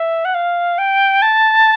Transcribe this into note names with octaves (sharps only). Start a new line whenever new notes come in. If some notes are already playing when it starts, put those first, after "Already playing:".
Already playing: E5
F#5
F5
G5
A5